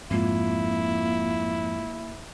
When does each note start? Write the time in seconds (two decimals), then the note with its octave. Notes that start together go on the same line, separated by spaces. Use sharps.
0.11 F2 G#2 G#3 A#3 E4 F4